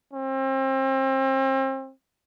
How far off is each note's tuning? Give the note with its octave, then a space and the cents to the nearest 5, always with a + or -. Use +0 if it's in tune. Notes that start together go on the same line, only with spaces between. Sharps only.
C4 +35